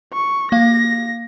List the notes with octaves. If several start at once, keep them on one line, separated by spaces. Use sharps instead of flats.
C#6
A#3 F5 A#6